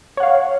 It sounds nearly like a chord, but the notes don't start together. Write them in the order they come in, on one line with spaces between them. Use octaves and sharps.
C#5 F#5 F5